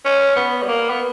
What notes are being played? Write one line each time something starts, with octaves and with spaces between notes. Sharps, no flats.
C#4
B3
G3
A#3
B3